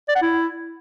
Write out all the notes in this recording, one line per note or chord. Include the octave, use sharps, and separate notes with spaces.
D5
F#5
E4